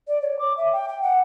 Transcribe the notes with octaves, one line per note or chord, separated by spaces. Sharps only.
D5
C#5
D6
E5
G5
G5
F#5